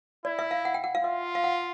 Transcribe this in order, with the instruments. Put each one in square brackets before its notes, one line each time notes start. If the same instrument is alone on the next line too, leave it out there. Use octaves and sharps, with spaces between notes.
[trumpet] E4 [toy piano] D5
[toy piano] E5
F5
F#5
G5
F#5
F5
[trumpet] F4 [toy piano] E5
[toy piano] F5
F#5